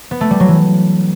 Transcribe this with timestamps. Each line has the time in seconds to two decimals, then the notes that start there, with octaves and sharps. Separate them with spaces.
0.11 B3
0.21 A3
0.31 G3
0.40 F#3
0.48 E3